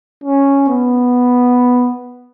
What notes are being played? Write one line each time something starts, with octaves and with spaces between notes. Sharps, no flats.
C#4
B3